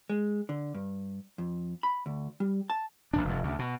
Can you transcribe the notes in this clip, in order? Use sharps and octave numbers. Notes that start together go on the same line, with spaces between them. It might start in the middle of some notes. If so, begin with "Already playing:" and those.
G#3
D3
G2
F2
B5
D2
G3
A5
A#1 D#3 D4
F1 G2
D2 C#3
B2